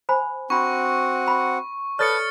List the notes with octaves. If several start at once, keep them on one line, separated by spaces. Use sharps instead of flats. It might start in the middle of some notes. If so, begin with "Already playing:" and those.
C5 G#5 B5
C4 D4 F#4 F#5 B5 C#6
B5
A4 B4 C#5 D5 A5 F6 A6 C#7